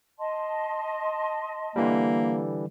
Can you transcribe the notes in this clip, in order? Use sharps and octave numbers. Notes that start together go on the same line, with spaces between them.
D#5 A5 C6
D3 E3 G3 A#3